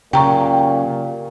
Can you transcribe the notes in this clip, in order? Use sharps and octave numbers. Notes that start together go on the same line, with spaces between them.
F#2 A#2 C#3 G4 G5 A#5 C#6